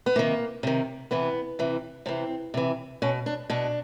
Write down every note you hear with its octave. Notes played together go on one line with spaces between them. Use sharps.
B3
C3 D#3 A#3
C3 D#3
C3 E3 B3
C3 E3
C3 E3 C4
C3 E3
B2 C#4
D4
B2 D4